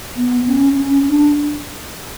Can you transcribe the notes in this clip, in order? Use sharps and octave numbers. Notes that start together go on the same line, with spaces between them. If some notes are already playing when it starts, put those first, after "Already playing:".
B3
C#4
C#4
D4